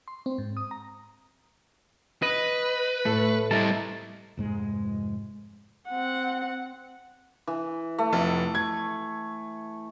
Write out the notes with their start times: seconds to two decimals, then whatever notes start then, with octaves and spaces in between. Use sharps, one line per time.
0.08 C6
0.26 C4
0.38 G#2
0.57 D#6
0.71 A#5
2.22 B4 D#5
3.05 A2 A3 A4 B6
3.51 G3 E4 D#5 A5 A#5
4.37 F1 G#2 G#3
5.89 C4 F#5
7.47 E3
7.98 A3
8.13 F1
8.55 G#6